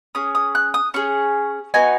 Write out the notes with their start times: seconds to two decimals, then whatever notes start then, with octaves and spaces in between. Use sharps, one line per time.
0.15 C#4 G#4 D#6
0.35 D#6
0.55 F#6
0.74 D#6
0.94 C#4 G#4 C#6
1.74 B3 D#4 F#4 G#5